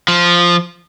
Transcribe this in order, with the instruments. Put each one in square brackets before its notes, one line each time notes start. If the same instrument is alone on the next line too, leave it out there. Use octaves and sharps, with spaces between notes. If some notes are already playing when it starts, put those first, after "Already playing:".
[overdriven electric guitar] F3